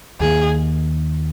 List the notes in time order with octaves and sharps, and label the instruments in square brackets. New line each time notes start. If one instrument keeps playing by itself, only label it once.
[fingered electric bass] D#2 D#3 A#3 [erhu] G#4